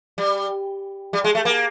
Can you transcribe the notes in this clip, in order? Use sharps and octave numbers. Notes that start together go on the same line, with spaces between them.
G3
G3
G#3
A3
A#3